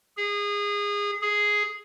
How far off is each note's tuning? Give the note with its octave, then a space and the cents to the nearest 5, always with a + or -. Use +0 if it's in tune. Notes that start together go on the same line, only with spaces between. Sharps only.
G#4 -25
G#4 +0